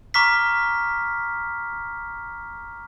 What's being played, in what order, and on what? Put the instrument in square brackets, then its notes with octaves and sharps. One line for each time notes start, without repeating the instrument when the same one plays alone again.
[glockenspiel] A#5 C#6 D6 F6 B6